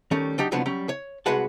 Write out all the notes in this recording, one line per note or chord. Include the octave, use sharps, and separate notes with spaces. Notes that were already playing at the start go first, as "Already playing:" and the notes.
D#3 G3 A3 C#4
F#3 D4 D#4 G4
C2 F3 F#3 B3 D4 F#5
F#3 G3 C#4
C#5
C2 G#3 F#4 B4 F#5 A5